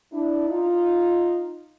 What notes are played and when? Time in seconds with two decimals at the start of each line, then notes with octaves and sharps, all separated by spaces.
0.13 D4 E4
0.48 D#4 F4